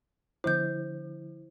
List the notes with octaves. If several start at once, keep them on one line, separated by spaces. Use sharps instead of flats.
D3 F3 E4 C5 G6